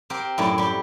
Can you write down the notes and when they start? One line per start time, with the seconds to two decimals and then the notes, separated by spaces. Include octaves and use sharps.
0.10 C4 G4 A#4
0.38 F#2 A2 E4 D5
0.58 G3 G4